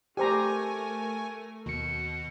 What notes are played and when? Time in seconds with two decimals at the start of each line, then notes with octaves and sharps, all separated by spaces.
0.17 A3 G4 A#4 C5 G#5 A#5 C#6
1.66 D#2 B2 C#7